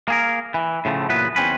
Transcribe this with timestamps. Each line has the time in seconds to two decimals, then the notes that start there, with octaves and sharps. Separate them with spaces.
0.08 A#3 G#4 A#4
0.54 E3
0.85 A2 C#3 F3 A3
1.09 E2 A#2 E3 F#3 B3 B4
1.36 E2 C4 C#4 B4